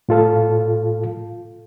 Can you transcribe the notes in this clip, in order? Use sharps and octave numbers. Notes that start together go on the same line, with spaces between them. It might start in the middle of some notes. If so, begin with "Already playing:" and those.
A2 F4 A4 F5